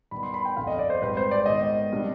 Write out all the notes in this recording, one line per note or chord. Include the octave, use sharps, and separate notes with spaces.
G2 D#3 B3 B5
C6
B5
G5
G1 F2 D3 F5
D#5
D5
C5
G#1 G#2 G3 C4 B4
C5
D5
G#2 D#3 B3 D#5
C3 G3 D4